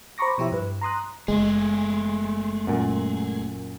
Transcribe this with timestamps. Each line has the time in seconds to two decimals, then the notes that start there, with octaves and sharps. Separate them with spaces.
0.18 C5 A#5 B5 C#6 D6 A#6
0.38 B2 F3 E4 G4 C#5 E5
0.52 G2 B4
0.81 A#5 C6 D#6 F#6
1.28 F#1 G#3 A3 G#4
2.67 F#2 A#2